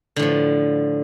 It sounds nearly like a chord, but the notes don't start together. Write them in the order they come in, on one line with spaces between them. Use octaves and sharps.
D3 A2 F3